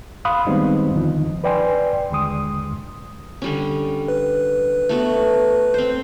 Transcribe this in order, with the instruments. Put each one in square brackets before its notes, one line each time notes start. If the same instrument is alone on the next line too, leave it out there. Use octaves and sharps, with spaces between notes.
[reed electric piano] F5 B5 C6 D#6 F#6
D#3 G3 G#3 B3 C4 D#4
E2 D3 D#3 F3 D#4
B4 D5 G5 G#5 C6
D#2 D3 G#3 C6 D#6
[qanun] D3 G3 C#4
[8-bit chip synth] B4
[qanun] A3 B3 F#4
C4 C5